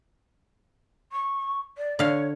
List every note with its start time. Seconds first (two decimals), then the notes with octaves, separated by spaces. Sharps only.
1.12 C#6
1.78 D5
1.99 D3 C#5 F5